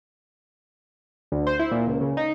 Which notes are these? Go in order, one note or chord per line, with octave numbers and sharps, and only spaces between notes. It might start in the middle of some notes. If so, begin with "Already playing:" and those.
D2
C5
E4
A#2
C#2
C#3
D#4